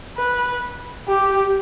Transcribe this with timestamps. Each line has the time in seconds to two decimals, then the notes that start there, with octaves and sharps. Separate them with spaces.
0.17 B4
1.08 G4